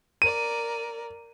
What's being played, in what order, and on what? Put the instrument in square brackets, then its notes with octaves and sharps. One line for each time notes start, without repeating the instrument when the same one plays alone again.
[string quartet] A#4 D5 [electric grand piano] D#7